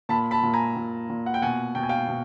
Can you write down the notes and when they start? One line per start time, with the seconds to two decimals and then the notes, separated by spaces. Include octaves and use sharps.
0.09 A#2 A5 B5
0.31 A5 B5
0.43 A#2
0.54 G#5 A#5
0.76 A#2
1.10 A#2
1.26 F#5
1.34 G5
1.42 B2 F#5 G#5
1.75 B2 G5
1.83 G#5
1.89 F5 G5
2.08 B2